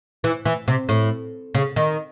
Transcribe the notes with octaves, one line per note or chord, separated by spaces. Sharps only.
E3
E3
C3
A2
C#3
D#3